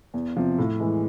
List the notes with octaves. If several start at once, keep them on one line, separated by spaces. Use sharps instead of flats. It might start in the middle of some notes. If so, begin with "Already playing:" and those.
E2
C3 F3
A2
E3 G#3